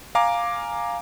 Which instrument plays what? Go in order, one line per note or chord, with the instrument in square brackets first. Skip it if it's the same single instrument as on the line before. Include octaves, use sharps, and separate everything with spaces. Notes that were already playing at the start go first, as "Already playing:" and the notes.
[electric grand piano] F5 G#5 A#5 D6